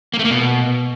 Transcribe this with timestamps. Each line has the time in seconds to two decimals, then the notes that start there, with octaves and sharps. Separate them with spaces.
0.14 A#3
0.19 A3
0.25 A#3
0.30 B2